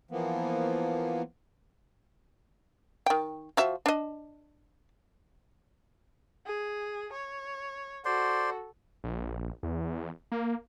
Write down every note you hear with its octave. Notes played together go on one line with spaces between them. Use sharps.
E3 F3 A#3 B3
D#3 G5
F3 F#4 E5
D4 D#5
G#4
C#5
F#4 A4 C5 D5 C6
A#1
E2
A#3